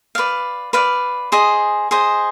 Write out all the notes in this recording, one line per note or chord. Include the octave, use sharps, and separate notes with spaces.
B4 D5 F5
B4 D5 F5
G#4 C5 D#5
G#4 C5 D#5